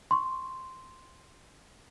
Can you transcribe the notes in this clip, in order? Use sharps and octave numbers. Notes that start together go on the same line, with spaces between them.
C6 C#6